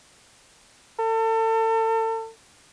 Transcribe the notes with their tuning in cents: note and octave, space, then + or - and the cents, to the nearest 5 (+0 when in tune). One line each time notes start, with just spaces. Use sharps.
A4 +35